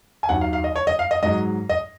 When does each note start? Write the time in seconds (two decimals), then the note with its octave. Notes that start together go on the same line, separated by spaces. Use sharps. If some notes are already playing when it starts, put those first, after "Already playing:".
0.23 G#5
0.29 D#2 D#3 F#3 F#5
0.41 F5
0.53 F5
0.64 D#5
0.76 C#5
0.87 D#5
0.99 F5
1.11 D#5
1.23 G#2 F#3 D#5
1.69 D#5